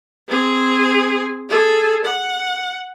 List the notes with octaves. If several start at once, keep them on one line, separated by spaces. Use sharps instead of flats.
C4 G#4
G#4 A4
F#5